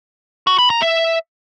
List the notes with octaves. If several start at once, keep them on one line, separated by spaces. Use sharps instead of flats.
F#4
B5
A#5
E5